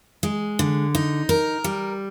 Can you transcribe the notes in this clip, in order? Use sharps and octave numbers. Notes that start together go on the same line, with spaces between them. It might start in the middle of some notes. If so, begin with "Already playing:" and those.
G#3
D3
D#4
A#4
G3